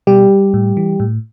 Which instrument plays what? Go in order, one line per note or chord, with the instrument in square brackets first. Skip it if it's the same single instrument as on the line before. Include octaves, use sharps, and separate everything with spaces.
[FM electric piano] B2 G3 G4
A2
E3
A2